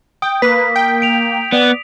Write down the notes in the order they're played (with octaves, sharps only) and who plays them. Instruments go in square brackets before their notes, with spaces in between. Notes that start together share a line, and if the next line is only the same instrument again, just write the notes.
[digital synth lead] G5 [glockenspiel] D#6
[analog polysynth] A#3 [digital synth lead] B4 [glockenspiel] B6
[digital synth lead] G5
[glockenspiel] D7 F7
[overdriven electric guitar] B3 [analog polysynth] D5